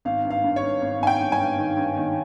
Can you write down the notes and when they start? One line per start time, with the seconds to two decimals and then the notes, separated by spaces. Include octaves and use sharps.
0.05 G#1 F5
0.25 G2
0.31 F5
0.44 G2
0.56 C#5
0.63 G2
0.82 G#1
1.01 G#1 G#5
1.07 G5
1.20 G2
1.32 G#5
1.39 G2
1.58 D#3
1.77 G2
1.96 D#3